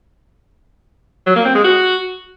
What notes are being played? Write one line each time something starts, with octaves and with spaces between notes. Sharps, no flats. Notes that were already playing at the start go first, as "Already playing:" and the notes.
F#3
A#3
C4
G#3
F#4